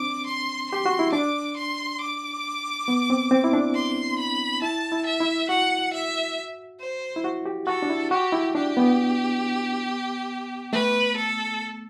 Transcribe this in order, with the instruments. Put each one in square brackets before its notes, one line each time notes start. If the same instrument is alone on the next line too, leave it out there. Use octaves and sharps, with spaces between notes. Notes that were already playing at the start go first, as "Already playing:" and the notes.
Already playing: [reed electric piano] C4 D4 [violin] D6
[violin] C6
[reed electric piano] G4 [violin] C6
[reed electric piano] F#4
E4
[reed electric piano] D4 [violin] D6
[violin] C6
D6
[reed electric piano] B3
C4
C4
E4
D4
[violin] C6
B5
[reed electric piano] E4 [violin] A5
[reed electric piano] E4
[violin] E5
[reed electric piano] E4
[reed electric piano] F#4 [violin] F#5
[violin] E5
C5
[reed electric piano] E4
F#4
G4
[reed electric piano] F#4 [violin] A4
[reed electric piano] D4
E4
[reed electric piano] F#4 [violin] G4
[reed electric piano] E4
[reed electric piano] D4 [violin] G4
[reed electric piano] B3
[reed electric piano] A3 [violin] B4
[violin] A4